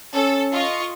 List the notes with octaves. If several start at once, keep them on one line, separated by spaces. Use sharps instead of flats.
C#4 A4
F4 D#5 C#6